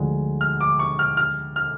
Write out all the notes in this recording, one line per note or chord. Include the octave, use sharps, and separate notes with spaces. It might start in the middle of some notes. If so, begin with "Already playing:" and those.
Already playing: D2 D3 F3 G#3
F6
D6
C#6
F6
F6
F6